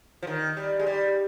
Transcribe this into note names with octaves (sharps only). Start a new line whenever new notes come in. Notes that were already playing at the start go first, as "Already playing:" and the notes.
F3
D#3
G3
G#3
G3